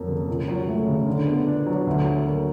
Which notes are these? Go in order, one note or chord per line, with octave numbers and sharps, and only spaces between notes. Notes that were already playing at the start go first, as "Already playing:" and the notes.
Already playing: F2 F#3 A#3
C#3
C#2
F#3
A3
C#3
D3
B3
D4
F#3
D2
F#3
A#3